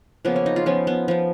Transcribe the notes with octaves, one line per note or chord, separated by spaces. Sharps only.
C#3 F3 A#3 B3
C#4
D#4
F4
F3 B3 C#4
B3
F3 B3